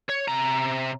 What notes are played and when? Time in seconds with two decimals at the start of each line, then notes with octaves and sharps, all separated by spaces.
0.10 C#5
0.28 C3 A#5